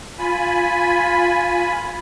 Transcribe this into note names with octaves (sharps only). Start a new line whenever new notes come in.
F4 G#5 B5